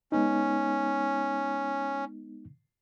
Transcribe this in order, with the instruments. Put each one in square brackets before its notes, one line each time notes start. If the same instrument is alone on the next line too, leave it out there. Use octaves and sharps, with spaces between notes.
[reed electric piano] G#3 B3 D#4 [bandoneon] C#4